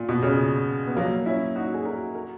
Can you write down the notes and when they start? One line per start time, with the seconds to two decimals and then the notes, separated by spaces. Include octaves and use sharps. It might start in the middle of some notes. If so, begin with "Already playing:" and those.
Already playing: A#2
0.09 B2
0.22 A#2 C#3
0.87 B3
0.97 F#3 A#3
1.26 C#4 E4
1.56 D#4 F#4
1.74 G#4
1.84 F#4 A#4
2.14 F#4 A#4